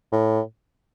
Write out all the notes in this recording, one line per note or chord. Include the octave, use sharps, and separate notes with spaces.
A2